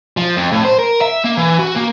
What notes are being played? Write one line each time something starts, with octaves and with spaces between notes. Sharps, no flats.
F3
F2
A2
C5
A#4
E5
A#3
E3
F#4
A#3